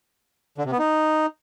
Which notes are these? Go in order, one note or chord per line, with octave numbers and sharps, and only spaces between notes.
D3
C3
B3
D#4